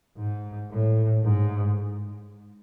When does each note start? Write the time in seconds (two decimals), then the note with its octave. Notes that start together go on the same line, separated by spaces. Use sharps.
0.18 G#2
0.71 A2
1.24 G#2